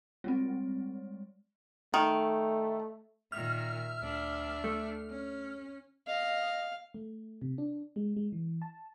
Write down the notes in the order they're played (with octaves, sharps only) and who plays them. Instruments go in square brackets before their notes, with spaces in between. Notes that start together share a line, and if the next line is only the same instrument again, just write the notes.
[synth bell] G3 G#3 C4
[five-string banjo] D#3 [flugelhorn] A3
[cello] A#2 D#3 [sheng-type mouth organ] E5 [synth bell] F6
[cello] D2 D4
[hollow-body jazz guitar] A3
[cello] C#4
[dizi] D#5 [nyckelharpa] F5
[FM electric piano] A3
C3
D4
G#3
G#3
E3
A5